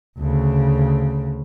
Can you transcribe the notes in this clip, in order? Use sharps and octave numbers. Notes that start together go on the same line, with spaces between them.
D2 C#3